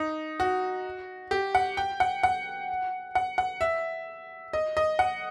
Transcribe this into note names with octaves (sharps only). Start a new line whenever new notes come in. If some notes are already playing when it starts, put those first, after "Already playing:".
Already playing: D#4
F#4
G4
F#5
G5
F#5
F#5
F#5
F#5
E5
D#5
D#5
F#5